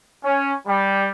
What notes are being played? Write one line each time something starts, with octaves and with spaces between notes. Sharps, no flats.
C#4
G3